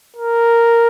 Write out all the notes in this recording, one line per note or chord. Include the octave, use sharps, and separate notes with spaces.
A#4